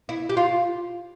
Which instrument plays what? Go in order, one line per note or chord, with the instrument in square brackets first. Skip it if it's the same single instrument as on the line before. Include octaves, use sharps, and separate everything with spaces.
[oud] E4
G4
F4